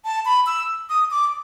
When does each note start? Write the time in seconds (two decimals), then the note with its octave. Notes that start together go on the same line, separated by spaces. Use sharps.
0.05 A5
0.25 B5
0.47 E6
0.90 D#6
1.11 D6